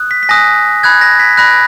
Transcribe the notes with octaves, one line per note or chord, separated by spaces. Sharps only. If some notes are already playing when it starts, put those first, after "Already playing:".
Already playing: D#6 F#6
B6
B6
G#5 D#6 F#6 A#6
B5 F#6 G#6
A#6
B6
B5 F#6 A#6